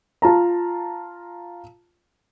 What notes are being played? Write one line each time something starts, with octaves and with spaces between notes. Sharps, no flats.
F4 A5 A#5